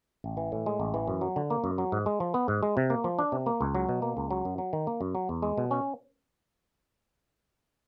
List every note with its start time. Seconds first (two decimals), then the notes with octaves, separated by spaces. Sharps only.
0.24 A1
0.37 E3
0.52 A2
0.66 G#3
0.80 A1
0.94 E3
1.08 F#2
1.21 F#3
1.36 D3
1.50 A#3
1.64 F#2
1.78 F#3
1.92 G#2
2.06 G#3
2.20 F3
2.34 B3
2.48 G#2
2.63 G#3
2.77 C3
2.90 A#3
3.04 F3
3.19 D4
3.32 C3
3.46 A#3
3.61 C#2
3.75 F#3
3.89 B2
4.02 A#3
4.17 C#2
4.31 F#3
4.45 F#2
4.58 F#3
4.73 D#3
4.87 A#3
5.01 F#2
5.15 F#3
5.29 E2
5.42 G#3
5.58 B2
5.71 C#4